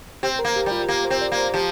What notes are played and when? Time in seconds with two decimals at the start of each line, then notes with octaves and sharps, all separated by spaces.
0.23 C4 G4
0.39 A#4
0.45 A#3
0.56 G4
0.66 G3
0.71 F4
0.89 A#3 G4
1.05 C5
1.10 C4
1.21 D5
1.32 A#3
1.38 C5
1.54 F3 G4